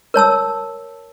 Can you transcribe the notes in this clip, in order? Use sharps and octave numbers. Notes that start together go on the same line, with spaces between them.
A#4 C#5 A5 E6